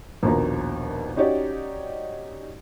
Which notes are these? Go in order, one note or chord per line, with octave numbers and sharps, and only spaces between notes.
A#1 D#2 B2 A#3 A#5
C#4 D#4 F#4 G4 C#5 D5